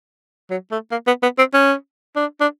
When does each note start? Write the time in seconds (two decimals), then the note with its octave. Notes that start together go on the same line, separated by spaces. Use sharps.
0.50 F#3
0.71 A3
0.91 A#3
1.07 B3
1.23 B3
1.38 C4
1.54 C#4
2.16 D4
2.40 D4